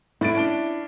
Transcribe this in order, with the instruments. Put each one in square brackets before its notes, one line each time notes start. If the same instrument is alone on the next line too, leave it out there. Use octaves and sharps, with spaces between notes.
[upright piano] A2 A6 D7 [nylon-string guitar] E4
[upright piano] C#4 D4 G7